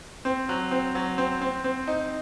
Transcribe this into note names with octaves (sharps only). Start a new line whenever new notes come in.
C4
F#3
C4
F#3
C4
C4
C4
D#4